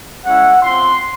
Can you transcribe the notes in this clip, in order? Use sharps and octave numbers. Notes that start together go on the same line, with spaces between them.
G#3 C#4 E4 F#5
C4 F4 C6